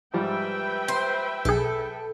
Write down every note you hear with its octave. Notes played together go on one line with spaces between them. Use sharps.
G#2 F3 G3 B4 E5 G5
C5
B1 G#4 A4